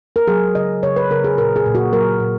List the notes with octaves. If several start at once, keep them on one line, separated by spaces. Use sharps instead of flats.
A#4
F#3 G#4
C#3 D#5
C#3 C#5
B4
C#3 A#4
G#4
A#2 A#4
G#4
A#2
F#4
F#3 A#4
A#2